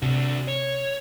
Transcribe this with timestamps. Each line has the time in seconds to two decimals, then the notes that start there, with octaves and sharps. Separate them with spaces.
0.02 C3 D4 F#4
0.48 C#5